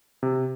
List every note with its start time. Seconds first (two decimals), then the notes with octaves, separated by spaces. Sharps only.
0.23 C3